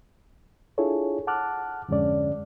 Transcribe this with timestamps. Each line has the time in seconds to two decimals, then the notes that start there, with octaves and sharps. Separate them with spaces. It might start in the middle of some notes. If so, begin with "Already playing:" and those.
0.78 D4 E4 F4 G#4 A4 C#5
1.27 F#5 A5 D6 F6 F#6
1.89 F2 G#2 D3 G#3 C#4 D5